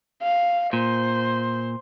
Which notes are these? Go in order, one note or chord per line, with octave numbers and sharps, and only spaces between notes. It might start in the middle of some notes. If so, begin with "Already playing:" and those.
F5
A#2 C5